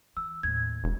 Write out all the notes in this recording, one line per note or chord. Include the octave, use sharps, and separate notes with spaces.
E3 E6
D#2 A2 G#6
E1